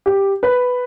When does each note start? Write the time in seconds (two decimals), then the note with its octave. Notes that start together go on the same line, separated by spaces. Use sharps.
0.06 G4
0.43 B4